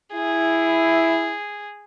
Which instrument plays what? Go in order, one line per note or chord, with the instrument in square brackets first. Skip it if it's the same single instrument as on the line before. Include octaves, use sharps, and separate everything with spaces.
[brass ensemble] E4 [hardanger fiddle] G#4